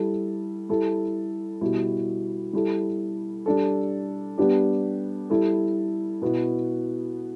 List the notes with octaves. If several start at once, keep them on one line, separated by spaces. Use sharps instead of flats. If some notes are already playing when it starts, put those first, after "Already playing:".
Already playing: G3 E4 A4
G3 E4 A4
B2 G3 E4
G3 E4 A4
G3 D4 A4
G3 B3 D4 G4
G3 E4 A4
B2 B3 E4